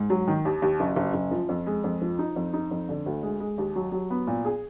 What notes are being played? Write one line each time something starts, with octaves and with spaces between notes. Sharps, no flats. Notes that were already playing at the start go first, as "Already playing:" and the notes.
Already playing: G#2
F#3
D#3
D#2
D#2
F#1
F#1
F#1
F3
F2
G#3
F2
F3
D#4
F2
D#4
F2
D3
D2
G#3
G#3
D#2
F#3
F#3
B3
A#2
G#4